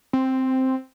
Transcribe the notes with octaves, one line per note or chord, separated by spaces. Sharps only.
C4